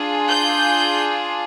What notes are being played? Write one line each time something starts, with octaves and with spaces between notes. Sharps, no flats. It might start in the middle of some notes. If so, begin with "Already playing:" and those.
Already playing: D4 F4 G#4
G6